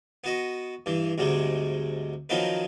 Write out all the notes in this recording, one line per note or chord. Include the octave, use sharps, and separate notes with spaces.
B3 F#4 D#5
G2 E3
D2 G#2 C3 G3 G#3
D#3 F3 F#3 C4 D#4 B4